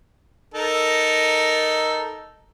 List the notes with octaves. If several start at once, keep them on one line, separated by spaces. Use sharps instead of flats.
D#4 A4 A#4